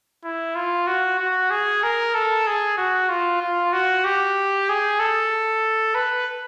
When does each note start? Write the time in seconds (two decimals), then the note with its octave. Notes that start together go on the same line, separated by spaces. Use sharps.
0.24 E4
0.55 F4
0.87 F#4
1.19 F#4
1.50 G#4
1.83 A#4
2.15 A4
2.47 G#4
2.77 F#4
3.09 F4
3.41 F4
3.73 F#4
4.04 G4
4.69 G#4
4.99 A4
5.95 B4